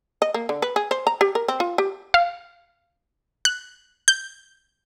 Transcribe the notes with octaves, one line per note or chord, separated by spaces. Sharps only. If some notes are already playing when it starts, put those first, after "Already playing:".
D#5
A#3
D3
B4
G#4
C5
A#5
G4
A#4
C4
F4
G4
F5
F#6
G6